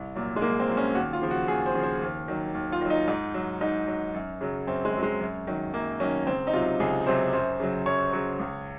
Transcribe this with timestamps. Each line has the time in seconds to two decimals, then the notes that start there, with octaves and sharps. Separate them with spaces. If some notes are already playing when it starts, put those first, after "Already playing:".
Already playing: C2
0.15 A#2 F#3
0.36 G#3
0.42 C2 A#3
0.60 C4
0.68 A#2 F#3
0.77 C#4
0.95 D#2 F#4
1.13 F4
1.22 C#3 F3
1.31 F#4
1.48 D#2 G#4
1.66 C5
1.75 C#3 F3
1.83 C5
2.01 D#2
2.28 D#3 F#3
2.54 D#2
2.72 F4
2.81 D#3 F#3
2.90 D#4
3.08 G#2 D#4
3.34 F#3
3.61 G#2 D#4
3.88 F#3
4.14 F#2
4.41 C#3 F#3
4.67 F#2 C4
4.85 G#3
4.94 C#3 F#3
5.03 G#3
5.20 F#2
5.47 D#3 F#3
5.74 F#2 A#3
6.00 D#3 F#3 C#4
6.27 C#2 C4
6.47 D#4
6.53 C3 F#3 F4
6.80 C#2 G#4
7.06 C3 F#3 C5
7.33 F#2 C5
7.60 C#3 F#3
7.86 F#2 C#5
8.13 C#3 F#3 C#5
8.39 C#2